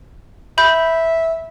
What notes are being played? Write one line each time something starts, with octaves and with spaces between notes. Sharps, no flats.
E5 B5 G6